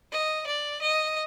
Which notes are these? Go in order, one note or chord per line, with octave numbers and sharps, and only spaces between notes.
D#5
D5
D#5